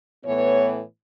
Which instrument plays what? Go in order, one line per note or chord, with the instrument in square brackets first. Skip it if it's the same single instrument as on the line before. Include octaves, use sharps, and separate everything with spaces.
[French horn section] A2 E3 B3 C#5